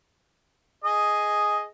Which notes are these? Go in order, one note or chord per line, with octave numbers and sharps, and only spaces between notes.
G#4 D#5